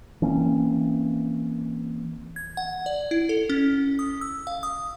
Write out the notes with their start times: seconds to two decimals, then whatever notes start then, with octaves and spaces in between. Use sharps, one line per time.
0.22 E3 A#3 C4 C#4
2.36 G#6
2.57 F#5
2.86 D5
3.11 E4
3.29 A4
3.49 C#4
3.99 D#6
4.21 E6
4.47 F5
4.63 D#6